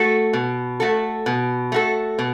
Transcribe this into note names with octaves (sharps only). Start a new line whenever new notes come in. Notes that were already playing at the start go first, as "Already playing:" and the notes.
Already playing: A3 F#4 A4
B2
A3 F#4 A4
B2
A3 F#4 A4
B2